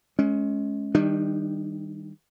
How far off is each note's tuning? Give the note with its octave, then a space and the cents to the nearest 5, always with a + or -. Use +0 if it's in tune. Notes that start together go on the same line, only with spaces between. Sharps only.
G#3 +30 C#4 +5
D#3 +15 G3 +15 D4 +45